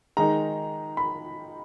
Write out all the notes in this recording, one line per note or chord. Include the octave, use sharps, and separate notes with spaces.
D#3 G#3 D#4 A#5
B5